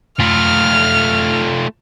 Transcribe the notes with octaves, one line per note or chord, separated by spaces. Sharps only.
A3 F4 F6